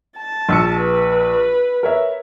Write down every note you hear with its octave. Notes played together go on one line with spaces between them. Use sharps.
A5
A#1 E6 C#7
B4
A#4 C#5 E5